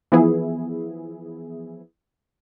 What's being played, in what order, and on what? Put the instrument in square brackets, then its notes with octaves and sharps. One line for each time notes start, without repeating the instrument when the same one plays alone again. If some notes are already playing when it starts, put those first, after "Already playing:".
[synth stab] E3 F3 B3 E4 G#4